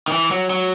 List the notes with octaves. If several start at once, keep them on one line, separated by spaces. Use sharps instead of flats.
D#3
E3
F#3
F#3